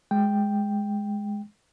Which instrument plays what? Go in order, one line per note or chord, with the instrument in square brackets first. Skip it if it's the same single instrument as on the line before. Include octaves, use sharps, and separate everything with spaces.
[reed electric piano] G#3 G5